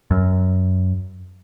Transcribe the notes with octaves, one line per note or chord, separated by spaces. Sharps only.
F#2